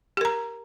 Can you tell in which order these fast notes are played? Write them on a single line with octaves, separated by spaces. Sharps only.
G4 A#4 A#5